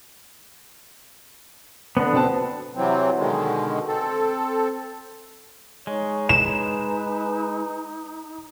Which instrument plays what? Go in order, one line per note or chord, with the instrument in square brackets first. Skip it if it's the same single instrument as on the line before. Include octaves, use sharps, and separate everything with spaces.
[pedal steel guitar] D3 B3
[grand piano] B2 C4 A5
[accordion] C3 E3 F#3 C4
B2 D3 D#3 G#3
C4 A4
[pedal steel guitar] G#3 [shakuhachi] D#4 [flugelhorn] C#5
[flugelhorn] B4 [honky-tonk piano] E7